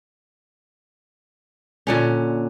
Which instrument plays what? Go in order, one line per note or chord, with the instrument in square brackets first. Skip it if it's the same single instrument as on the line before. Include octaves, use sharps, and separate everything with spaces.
[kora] A#2 D3 C#4